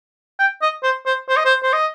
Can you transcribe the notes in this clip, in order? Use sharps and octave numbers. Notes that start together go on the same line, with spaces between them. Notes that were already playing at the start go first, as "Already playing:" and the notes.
G5
D#5
C5
C5
C5
D#5
C5
C5
D#5